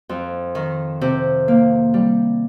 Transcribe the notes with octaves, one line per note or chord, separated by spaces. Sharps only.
F2
D#3
C3
A#3
G3